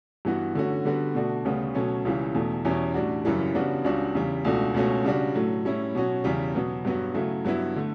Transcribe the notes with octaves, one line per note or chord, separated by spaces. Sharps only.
G2 E3 B3 F#4
D3 A3 C#4 F#4
D3 G3 B3 F#4
B2 A3 D4 F#4
D2 C#3 G3 B3
B2 F#3 A3 C#4
C#2 C#3 E3 G3
E2 B2 A3
E2 B2 G3 C#4 E4
A2 G3 D4 F#4
F#2 C#3 E3 G3
C#3 G3 B3 D4 F#4
C#2 C#3 G3 D4 F#4
E2 C#3 G3
C#2 B2 A3 D4 F#4
C#2 B2 A3 C#4 F#4
C#3 G3 D4 F#4
A2 F#3 A3
A2 G3 C#4 E4
B2 F#3 C#4 F#4
E2 C#3 G3
B2 F#3 B3
G2 F#3 B3 F#4
C#3 F#3 A3 E4
G2 F#3 B3 E4
D3 A3